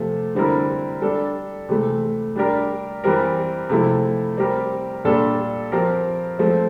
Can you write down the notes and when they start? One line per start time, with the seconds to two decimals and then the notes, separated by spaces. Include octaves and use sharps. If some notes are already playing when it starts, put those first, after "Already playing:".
Already playing: C3 F3 A3
0.35 D3 G3 C4 E4 A#4
1.02 G3 D4 A4
1.69 C3 E3 A3
2.35 G3 D4 G4 A#4
3.04 E3 G3 C4 G4 A#4
3.70 C3 F3 A3 E4
4.37 G3 C4 G4 A#4
5.05 A#2 G3 D4 A4
5.72 F3 C4 G4 A#4
6.39 F3 A3 C4